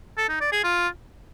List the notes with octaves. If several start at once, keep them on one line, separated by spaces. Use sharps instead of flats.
A4
D#4
D5
G#4
F4